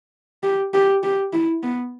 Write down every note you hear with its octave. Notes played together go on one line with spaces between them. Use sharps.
G4
G4
G4
E4
B3